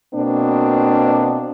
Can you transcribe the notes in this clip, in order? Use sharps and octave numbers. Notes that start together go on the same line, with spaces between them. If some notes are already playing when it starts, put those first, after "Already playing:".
B2 A#3 C4 D4